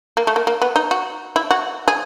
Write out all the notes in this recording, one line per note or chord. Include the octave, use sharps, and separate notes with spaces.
A#3
A3
A#3
A#3
B3
D#4
F#4
E4
F#4
G#4